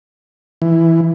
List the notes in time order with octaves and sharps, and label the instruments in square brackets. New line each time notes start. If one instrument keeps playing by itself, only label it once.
[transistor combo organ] E3